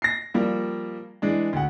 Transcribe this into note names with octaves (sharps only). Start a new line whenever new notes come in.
A#6 C7
F3 G3 A#3
E3 G#3 D4
D2 F#5